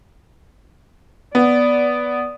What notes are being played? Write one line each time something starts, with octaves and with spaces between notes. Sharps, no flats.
B3 D5